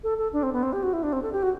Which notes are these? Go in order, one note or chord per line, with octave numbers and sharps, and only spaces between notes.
A4
A4
D4
C4
B3
C4
G4
F#4
E4
D4
C4
A4
G4
F#4